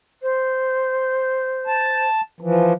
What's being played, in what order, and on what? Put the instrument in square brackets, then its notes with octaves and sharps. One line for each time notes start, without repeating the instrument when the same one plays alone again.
[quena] C5
[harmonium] A5
E3 F3